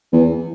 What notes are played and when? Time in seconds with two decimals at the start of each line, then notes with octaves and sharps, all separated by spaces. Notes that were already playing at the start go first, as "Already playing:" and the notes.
0.13 E2